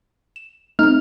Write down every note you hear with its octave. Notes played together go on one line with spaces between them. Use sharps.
E7
A3 C4 D#4 F6